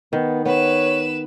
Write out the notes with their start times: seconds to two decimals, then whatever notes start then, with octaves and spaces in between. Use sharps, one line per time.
0.13 D#3 B3
0.46 B3 B4 C#5 E7